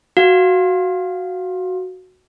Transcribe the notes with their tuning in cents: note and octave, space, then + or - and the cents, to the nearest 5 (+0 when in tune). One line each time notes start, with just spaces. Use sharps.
F#4 +0 F5 +0